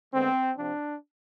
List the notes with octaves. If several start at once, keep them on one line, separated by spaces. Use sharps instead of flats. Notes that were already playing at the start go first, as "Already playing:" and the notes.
D3 G#3 B3 C4
C3 F3 C4 D4